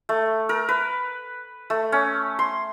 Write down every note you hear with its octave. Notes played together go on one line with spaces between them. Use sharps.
A3
A#4
B4
A3
C#4
C6